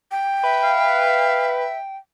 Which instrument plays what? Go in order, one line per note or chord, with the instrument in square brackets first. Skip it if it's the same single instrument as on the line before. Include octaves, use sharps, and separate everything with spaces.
[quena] G5
[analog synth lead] B4 [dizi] E5
[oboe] F5